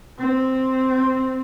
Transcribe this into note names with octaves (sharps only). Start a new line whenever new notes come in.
C4